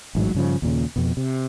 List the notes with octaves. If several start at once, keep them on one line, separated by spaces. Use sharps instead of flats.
A1 G#2 F3 F#3
G2 C#3 F3
D#2 A#2 C#3
F2 B2
C3